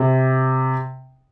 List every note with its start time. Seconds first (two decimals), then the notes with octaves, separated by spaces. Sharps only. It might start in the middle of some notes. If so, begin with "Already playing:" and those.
Already playing: C3